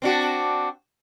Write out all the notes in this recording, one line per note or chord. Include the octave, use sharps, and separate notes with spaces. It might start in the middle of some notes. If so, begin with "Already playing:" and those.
C4 D4 F#4